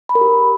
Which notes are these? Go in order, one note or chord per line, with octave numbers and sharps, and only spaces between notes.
B5
A#4
G4